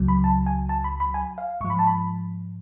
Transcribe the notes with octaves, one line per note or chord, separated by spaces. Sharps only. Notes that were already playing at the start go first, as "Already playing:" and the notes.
Already playing: C#2 C#3 F#3
B5
A5
G#5
A5
B5
B5
G#5
F5
G#2 F3 C#6
B5
A5
B5